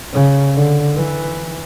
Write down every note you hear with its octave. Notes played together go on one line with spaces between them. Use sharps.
C#3
D3
E3